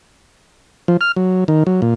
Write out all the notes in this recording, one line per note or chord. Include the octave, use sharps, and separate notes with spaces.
F3
F6
F#3
D#3
F#3
A#2